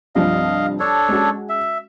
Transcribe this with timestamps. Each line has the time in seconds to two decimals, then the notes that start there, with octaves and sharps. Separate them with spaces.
0.15 C2 G2 F3 D#5 F5
0.80 D4 A4 C#5
1.09 G#3 C#4 F#4
1.49 E5